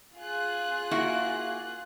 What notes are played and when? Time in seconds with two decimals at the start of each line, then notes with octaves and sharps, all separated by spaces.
0.17 F4 G#4 F#6
0.91 A#3 E4 F#4